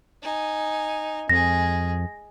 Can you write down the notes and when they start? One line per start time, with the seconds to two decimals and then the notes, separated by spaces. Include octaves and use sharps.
0.22 D#4 G#5
1.29 F2 G#3 G#4 A#6